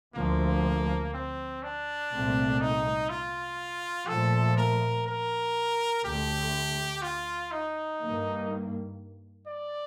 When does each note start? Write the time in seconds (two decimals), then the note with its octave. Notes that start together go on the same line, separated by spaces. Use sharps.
0.15 D2 D3 F3 A3 A#3
1.13 C4
1.63 D4
2.12 C2 A#2 A3 C4
2.60 D#4
3.09 F4
4.07 A#2 F3 A3 A4
4.57 A#4
5.06 A#4
6.04 D2 D3 A3 G4
7.02 F4
7.51 D#4
8.01 G2 D#3 A#3
9.47 D5